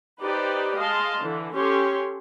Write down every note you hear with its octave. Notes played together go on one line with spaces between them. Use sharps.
D#4 G4 B4 C5 D5
G#3 D#5 F5 A5 C6
D3 E3
C#4 G4 A4 C#5 C6